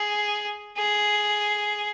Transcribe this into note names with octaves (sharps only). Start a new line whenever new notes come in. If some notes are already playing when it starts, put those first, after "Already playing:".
Already playing: G#4
G#4